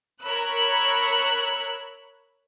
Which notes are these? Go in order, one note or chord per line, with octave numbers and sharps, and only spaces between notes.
A#4 C#5 B5 E6 F#6